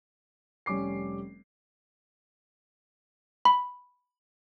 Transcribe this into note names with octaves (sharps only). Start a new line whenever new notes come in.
F1 G3 C#4 D6 C7
B5